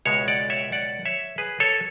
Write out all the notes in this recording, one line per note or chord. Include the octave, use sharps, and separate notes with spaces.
C#2 B2 G#3 C#5 E5
D5 F#5
C#5 E5
D5 F#5
C#5 E5
G#4 B4
A4 C#5